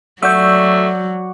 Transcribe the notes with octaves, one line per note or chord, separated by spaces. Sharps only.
F#3 A3 F#4 D5 F#5 E6 G6